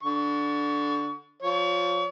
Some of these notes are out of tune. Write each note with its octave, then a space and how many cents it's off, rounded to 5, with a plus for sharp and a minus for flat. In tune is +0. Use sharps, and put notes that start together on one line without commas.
D3 -5 C#6 +25
F3 +20 C#5 +35